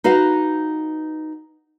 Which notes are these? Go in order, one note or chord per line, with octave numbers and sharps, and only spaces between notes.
D#4 F#4 B4 F5